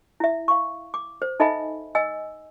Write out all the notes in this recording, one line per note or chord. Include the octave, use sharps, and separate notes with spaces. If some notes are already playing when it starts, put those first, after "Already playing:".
E4 E5
F5 C#6
D6
C5
D#4 A4 D#5 E5 G#5 B5
D#5 G#5 E6